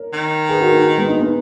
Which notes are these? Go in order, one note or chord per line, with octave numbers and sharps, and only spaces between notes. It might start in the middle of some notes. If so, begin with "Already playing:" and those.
Already playing: A#4 C#5
D#3
G#4 B4
F#4 A#4
D#4 F#4
G#3 B3
B3 D#4
B3 D#4